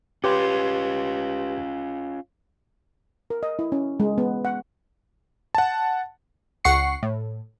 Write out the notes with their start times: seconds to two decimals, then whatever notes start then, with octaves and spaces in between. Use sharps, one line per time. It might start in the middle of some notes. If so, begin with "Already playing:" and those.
0.24 C#4 F4 G4 B4 C6
3.30 A#4
3.43 D#5
3.59 E4
3.72 C#4
4.00 G#3
4.18 B3
4.45 F#5
5.55 F#5 A5
6.65 C#2 F#5 C#6 C7 C#7
7.03 A2